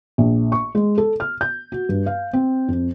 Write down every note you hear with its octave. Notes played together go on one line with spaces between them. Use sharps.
A#1
C#6
G#3
A4
F6
G6
F#4
G2
F5
C4
F2